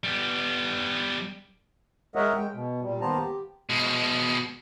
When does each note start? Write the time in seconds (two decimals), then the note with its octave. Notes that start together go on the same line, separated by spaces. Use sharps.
0.04 G3 B3
2.16 G#3 A#4 C#5 D#5 E5 F#5
2.37 G#3 G5
2.53 B2
2.82 A#2 G3
3.01 D#3 A#3 B3 C5 A5 A#5
3.18 G4
3.69 B2 G#3